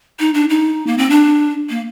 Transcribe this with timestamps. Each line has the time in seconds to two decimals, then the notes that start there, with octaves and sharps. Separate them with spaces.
0.20 D#4
0.34 D4
0.50 D#4
0.87 A#3
0.98 C4
1.10 D4
1.70 A#3